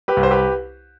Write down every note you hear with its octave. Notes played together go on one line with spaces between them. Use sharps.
G4 B4
C2
C5
G4 B4